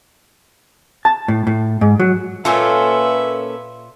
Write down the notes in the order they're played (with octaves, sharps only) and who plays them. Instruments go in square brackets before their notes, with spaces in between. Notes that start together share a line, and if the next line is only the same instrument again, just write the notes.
[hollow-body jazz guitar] A5
A2
A2
G#2
F#3
[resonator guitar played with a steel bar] A#2 F4 [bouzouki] A#3 C#4 A4 [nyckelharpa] B4 E5